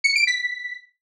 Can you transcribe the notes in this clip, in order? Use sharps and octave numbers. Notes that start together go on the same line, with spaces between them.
C#7
D7
B6